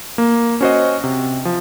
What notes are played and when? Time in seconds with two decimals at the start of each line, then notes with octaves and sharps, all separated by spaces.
0.18 A#3
0.61 C#4 F#4 C5 D#5
1.04 C3
1.45 F3